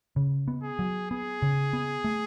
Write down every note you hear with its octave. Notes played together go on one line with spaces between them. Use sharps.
C#3
B3
G#4
F#3
B3 G#4
C#3
B3
A3